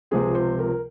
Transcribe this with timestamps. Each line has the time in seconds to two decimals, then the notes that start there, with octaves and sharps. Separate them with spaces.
0.11 C#2 C3 F3 C4 G#4
0.35 C5
0.59 A#4